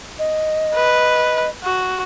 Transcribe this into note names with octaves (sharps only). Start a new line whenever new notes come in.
D#5
B4
F#4